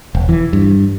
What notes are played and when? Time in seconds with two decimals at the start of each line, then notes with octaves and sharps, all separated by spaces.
0.15 E1
0.29 E3
0.53 G2